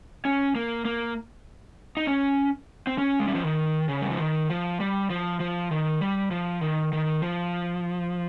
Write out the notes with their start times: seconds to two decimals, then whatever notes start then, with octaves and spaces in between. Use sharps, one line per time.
0.25 C#4
0.55 A#3
0.85 A#3
1.97 D#4
2.07 C#4
2.87 C4
2.98 C#4
3.19 G#3
3.28 G3
3.35 F3
3.44 D#3
3.89 C#3
4.02 G3
4.10 F3
4.19 D#3
4.50 F3
4.80 G3
5.10 F3
5.40 F3
5.71 D#3
6.01 G3
6.31 F3
6.61 D#3
6.93 D#3
7.22 F3